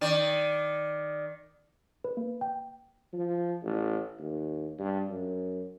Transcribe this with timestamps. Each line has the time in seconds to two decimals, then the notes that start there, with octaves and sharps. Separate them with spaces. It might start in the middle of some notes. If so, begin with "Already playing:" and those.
0.01 D#3 D5
2.04 B4
2.17 A#3
2.41 G5
3.13 F3
3.63 A1
4.19 D#2
4.79 G2
5.10 F#2